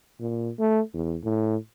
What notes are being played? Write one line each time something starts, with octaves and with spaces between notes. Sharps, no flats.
A#2
A3
E2
A2